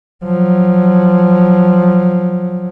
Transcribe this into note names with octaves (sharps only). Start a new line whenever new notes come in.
F3 F#3